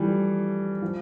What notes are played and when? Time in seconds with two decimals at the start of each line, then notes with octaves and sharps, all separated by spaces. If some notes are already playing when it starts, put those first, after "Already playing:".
Already playing: E3 F3 G3 A3
0.82 F3